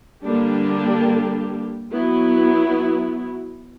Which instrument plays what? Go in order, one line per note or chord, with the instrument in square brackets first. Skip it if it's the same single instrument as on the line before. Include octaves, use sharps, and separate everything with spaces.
[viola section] D3 G3 A#3 D4 G4
F#3 B3 E4